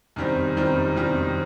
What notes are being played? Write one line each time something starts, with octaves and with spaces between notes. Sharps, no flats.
F#2 D#3 G3 C4
F#2 D#3 G3 C4
F#2 D#3 G3 C4